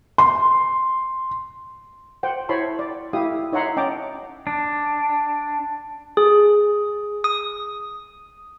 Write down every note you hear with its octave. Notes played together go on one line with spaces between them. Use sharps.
C6
C5 F#5 G5
E4 C5 C#5 A5 B5 C6
D5
E4 G4 E5 F5 D#6
D#4 C#5 E5 F#5 A#5 C6
C#4 D#5 G5 A5 A#5 D6
D4
G#4
D#6